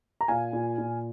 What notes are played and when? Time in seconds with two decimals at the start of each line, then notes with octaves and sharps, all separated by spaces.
0.21 A#5
0.28 A#2 F5 G#5
0.53 A#2
0.78 A#2